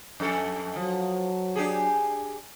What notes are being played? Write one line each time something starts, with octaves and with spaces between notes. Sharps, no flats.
F2 A4
F3 F#3
D4 G4 G#4